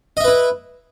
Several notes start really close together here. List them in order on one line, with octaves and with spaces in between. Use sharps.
D#5 E5 B4 E4